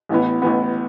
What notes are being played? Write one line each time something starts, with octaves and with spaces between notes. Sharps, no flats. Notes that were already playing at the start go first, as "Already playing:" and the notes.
A1 A2 E3 B3
A1 A2 E3 B3